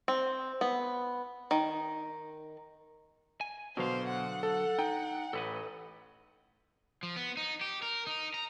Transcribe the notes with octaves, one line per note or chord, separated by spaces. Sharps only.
C4
B3
D#3
G#5
B2 D3 F#3 C5 F5
F#5
A4
D#4 G5
A1 A4 B4 D#5
F3
B3
D#4
G4
A#4
D#4
A#5